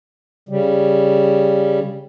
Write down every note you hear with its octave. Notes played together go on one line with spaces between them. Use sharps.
C#3 G3